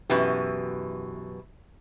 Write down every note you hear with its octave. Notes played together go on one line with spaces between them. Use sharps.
F#2 B2 E3 G4 B4